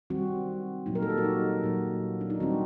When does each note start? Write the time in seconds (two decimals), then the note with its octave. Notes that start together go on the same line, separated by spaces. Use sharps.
0.10 D#3 G3 C4 F#4
0.86 A#2 F#3 A#3 D#4
0.95 A#4
1.02 A4
1.10 G4
1.18 F#4
1.25 D#4
1.63 A#2 F#3 A#3
2.21 D4
2.30 D#4
2.40 D#3 G3 C4 F#4